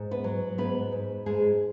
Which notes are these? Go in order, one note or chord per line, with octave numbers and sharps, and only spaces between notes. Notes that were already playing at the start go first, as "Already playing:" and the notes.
Already playing: G#2
B3 B4
F#3
G#2 B3 B4
G#2
G#2 G#3 G#4